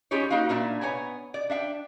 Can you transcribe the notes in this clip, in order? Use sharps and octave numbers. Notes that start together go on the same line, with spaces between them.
C#4 D#4 F4 G4 G#4 C#5
A#3 D#4 F#4 F5
A#2 A#3 D4 E5
B3 C#5 G5 G#5 A#5
D5
D4 E5 F5 G5